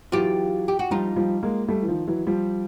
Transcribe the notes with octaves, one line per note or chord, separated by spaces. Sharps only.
E3 F#3 F4 G4
G4
F#4
F3 G3 D#4 F4
F3 G3
G#3 A#3
G3 A3
E3
D#3 F3
E3 F#3
F3 G3